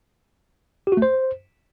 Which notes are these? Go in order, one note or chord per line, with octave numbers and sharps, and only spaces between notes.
G4
F#4
A3
C5